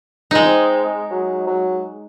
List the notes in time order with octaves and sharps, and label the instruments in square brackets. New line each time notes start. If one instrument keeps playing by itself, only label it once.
[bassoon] C#2 [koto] G#3 D#4
[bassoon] C4
F#3
F#3